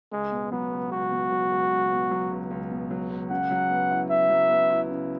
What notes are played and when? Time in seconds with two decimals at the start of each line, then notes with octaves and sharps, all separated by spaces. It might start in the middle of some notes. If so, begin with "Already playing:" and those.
0.11 C#2 G#3
0.32 B2
0.52 F#3 B3
0.72 C#2
0.91 C#2 F#4
1.12 B2
1.31 F#3
1.51 C#2
1.71 C#2
1.91 B2
2.11 F#3
2.31 C#2
2.51 C#2
2.71 B2
2.91 F#3
3.10 C#2
3.30 C#3 F#5
3.51 F#3
3.71 B3
3.91 E4
4.10 C#3 E5
4.30 F#3
4.50 B3
4.70 E4
4.91 C#3